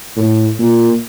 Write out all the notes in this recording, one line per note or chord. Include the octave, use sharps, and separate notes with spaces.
A2
A#2